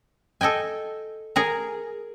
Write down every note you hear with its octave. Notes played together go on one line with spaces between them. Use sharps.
A4 D#5 G5 G#5
G#4 A#4 A#5